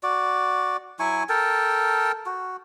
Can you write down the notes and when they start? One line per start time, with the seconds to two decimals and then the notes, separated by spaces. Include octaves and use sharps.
0.03 F#4 D5
1.00 F#3 E4 G#5 C#6
1.29 A4 A#4 G5 A5
2.26 F#4